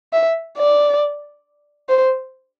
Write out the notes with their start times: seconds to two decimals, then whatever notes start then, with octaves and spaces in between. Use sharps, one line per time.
0.13 E5
0.58 D5
1.89 C5